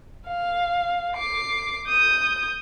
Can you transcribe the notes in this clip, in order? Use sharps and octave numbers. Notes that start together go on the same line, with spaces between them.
F5
D6 C7
D#6 G6